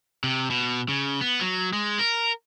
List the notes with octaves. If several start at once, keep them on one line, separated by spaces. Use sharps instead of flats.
C3
B2
C#3
B3
F#3
G#3
A#4